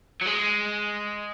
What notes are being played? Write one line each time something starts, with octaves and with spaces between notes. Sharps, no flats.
F#3
G#3